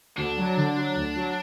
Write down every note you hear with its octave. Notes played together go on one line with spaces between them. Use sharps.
D2 D4
F#3
D3
F#3
D2
F#3